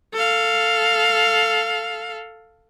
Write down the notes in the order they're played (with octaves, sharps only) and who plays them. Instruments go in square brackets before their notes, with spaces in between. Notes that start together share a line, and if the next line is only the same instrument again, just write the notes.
[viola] A4 F5